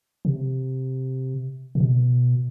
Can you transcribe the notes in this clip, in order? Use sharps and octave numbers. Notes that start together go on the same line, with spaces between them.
C3
A#2
B2